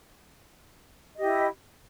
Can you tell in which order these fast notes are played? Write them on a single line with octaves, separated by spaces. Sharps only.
D#5 G4 E4